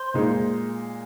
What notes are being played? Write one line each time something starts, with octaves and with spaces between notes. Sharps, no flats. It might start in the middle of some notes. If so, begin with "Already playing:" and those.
Already playing: C5
A#2 G#3 D#4